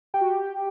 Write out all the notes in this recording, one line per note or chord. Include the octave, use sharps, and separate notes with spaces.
G4 G5
F#4
G4